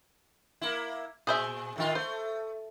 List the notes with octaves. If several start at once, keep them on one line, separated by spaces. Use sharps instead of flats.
A#3 E4
A#2 G#4 C5 E5
A2 D#3 F4
A3 C5